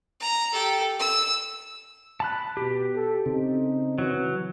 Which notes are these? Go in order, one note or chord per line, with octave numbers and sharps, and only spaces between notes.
A#5
G4 A4
E6
A5 B5 F#6
B2 G4
A4
C#3 C4 D#4
E3 F#3